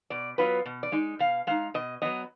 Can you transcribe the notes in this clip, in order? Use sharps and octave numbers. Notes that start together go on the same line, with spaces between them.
B2 D5
F#3 B3 F4 B4
B2
D5
G#3 D#4
B2 F5
G#3 D#4 F5
B2 D#5
F#3 B3 D#5